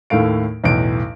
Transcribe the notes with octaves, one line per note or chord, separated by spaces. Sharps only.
D#2 A2 A3 F5 D7
B1 E2 A2 D7